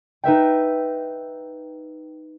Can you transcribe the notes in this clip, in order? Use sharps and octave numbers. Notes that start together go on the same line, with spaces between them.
D#4 B4 E5 G5